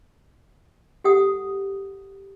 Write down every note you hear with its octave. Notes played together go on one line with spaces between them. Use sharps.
G4 A4 F#5 D#6